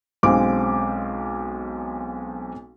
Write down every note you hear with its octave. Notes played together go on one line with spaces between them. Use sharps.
B1 G#3 C4 C#4 F5 D6